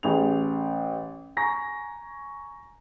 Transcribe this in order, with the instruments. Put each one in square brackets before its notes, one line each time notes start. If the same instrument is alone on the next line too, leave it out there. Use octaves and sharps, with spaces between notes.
[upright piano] A1 G#4 F7
G#5 A#5 C#6 A#6